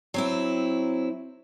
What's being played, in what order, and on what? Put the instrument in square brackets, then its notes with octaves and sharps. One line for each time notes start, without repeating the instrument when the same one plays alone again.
[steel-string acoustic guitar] F#3 C4 E4